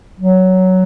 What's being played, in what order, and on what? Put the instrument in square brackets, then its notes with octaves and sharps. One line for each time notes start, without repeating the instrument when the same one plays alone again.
[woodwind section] F#3